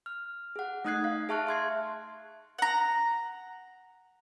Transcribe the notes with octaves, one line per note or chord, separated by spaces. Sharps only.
F6
G#4 F#5
A3 D#4 D#6 F#6 G#6 C7
F5
G#4 E5 A5 C#6 F6 F#6
E5 C6 G#6 C7
F#5 A#5